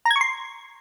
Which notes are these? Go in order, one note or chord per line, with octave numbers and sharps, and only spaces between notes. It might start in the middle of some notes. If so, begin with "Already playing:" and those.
A#5
G#6
C#6
C6